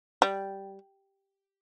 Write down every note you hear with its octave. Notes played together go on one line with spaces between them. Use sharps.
G3